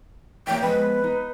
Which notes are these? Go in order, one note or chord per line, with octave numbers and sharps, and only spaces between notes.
A#3 C#5 E5 G5
F3 G#3 B3 B4
D#4